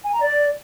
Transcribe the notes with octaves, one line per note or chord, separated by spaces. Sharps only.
G#5
A#5
D5